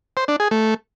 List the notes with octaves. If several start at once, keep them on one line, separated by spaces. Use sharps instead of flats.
C5
D4
G#4
A3